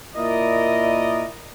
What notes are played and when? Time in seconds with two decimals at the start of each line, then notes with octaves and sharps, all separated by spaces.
0.16 A#2 E4 A#4 D5 D#5